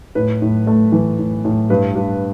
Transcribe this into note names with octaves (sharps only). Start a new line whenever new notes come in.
A2 B4
A2
A3
E3
A2
A2
G2 B4
G2